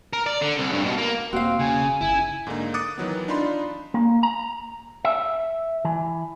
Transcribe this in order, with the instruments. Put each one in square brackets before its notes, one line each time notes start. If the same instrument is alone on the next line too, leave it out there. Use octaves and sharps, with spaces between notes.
[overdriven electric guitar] A#4
D5
D3
C2
G2
B2
A#3
[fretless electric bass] E1 A#3 [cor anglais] C4 [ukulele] F#4 F5
[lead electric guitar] C#3 [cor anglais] G#5
[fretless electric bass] G1 C#3 [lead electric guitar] E4 [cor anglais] G#5
[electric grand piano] G#2 D3 A#3 D#4
D6 D#6 F#6 A6 C#7
D#3 E3 F#3 B3
D4 D#4 F4 B5 C6
[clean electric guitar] A#3
A#5
E5
E3